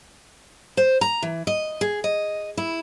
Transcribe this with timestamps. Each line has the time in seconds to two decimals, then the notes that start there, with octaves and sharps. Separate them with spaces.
0.77 C5
1.01 A#5
1.23 E3
1.47 D#5
1.81 G#4
2.04 D#5
2.57 E4